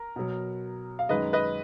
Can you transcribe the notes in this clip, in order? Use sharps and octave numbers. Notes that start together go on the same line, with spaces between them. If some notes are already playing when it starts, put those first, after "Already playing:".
Already playing: A#4
B2 F#3
F5
F#2 D#3 G#3 B4 D#5
B4 D#5